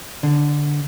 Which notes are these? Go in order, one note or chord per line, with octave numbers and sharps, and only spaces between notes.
D3